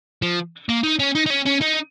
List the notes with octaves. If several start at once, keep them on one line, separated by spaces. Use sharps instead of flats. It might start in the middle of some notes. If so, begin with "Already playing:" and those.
F3
A#3
D#4
C#4
D#4
D#4
C#4
C#4
D#4